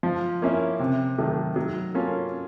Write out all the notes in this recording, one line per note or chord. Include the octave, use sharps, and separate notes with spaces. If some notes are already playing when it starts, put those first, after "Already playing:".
F3
A#3 C#4 E4
C3
D#3 F#3 A3
F#3
A#3 C#4 F4 A4